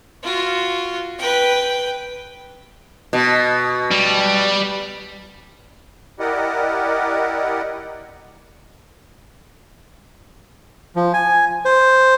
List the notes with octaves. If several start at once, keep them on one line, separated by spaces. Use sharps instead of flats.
F4 F#4
B4 G5
B2
G3
E4 G4 A#4 D5 D#5 F#5
F3
G#5
C5